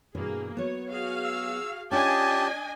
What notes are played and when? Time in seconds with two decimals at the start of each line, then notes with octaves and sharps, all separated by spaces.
0.15 G2 B2 E3 A#3 G#4
0.57 F#3 B3 C#5
0.90 F#4 G#4 F5
1.24 E6
1.91 C#4 D4 F4 G4 D#5 F#5 G#5 A5